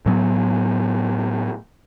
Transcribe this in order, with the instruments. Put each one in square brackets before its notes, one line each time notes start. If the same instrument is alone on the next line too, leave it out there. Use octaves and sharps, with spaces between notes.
[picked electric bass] A2 F#3 B3